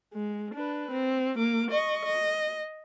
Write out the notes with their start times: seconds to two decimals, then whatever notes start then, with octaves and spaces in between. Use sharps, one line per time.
0.14 G#3
0.54 D4 B4
0.91 C4
1.38 A#3 D6
1.71 D#5 C#6
2.06 D#5